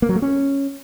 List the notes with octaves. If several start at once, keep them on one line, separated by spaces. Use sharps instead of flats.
A#3
F#3
A3
C#4